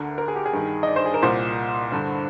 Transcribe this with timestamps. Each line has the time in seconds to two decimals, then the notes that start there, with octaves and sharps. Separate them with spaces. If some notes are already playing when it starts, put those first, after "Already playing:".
Already playing: D2 D3 A#4
0.18 A#4
0.28 G#4
0.36 G4
0.46 G#4
0.53 G2 D#3
0.83 D#5
0.87 D5
0.96 C5
1.06 G#4
1.14 A#4
1.23 C2 A#2 C5
1.92 G2 D3